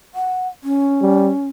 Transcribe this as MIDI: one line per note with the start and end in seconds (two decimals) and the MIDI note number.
0.15 0.48 78
0.64 1.47 61
1.01 1.31 55